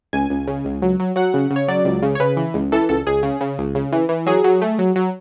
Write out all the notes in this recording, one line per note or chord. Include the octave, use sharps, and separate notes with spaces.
C#2 G#5
C#2
C#3
C#2
F#3
F#3
F#3 F#5
C#3
C#3
C#5
F#3 D5
C#2
C#3
C#5
C#3 B4
E3
C#2
E3 A4
C#2 A4
C#2 G#4
C#3
C#3
C#2
C#3
E3
E3
F#3 G#4
F#3
A3
F#3
F#3